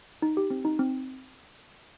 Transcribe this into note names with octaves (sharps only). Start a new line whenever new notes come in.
D#4
G4
C4
D#4
C4